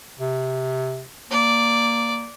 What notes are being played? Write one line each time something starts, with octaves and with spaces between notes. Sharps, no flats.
C3
A#3 D5